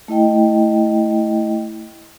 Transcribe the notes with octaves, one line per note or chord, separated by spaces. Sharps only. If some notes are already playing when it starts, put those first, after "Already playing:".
A3 E4 D#5 G5